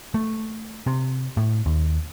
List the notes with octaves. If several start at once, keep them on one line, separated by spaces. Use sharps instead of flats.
A3
C3
A2
D#2